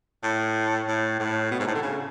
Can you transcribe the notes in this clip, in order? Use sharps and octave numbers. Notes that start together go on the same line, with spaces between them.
A2
A2
A2
B2
G#2
A2
D3
C#3